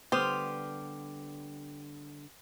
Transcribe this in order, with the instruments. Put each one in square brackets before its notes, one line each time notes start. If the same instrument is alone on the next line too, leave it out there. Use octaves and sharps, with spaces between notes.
[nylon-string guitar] D3 G3 B3 [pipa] G4 [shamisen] C5 [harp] C6 D#6 F6